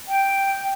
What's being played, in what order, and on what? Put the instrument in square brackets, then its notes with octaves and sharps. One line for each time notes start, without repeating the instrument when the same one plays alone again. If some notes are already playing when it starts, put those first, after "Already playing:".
[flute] G5